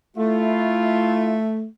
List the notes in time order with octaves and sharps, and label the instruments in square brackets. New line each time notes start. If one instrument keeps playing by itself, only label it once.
[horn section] A3 [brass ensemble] E4 F4